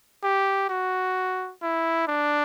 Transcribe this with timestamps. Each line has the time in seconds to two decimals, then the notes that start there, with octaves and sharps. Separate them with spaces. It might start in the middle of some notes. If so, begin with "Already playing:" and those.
0.23 G4
0.69 F#4
1.62 E4
2.08 D4